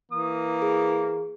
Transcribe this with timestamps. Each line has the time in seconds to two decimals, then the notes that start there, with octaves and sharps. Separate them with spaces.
0.12 E3 A#3 D#6
0.62 G#4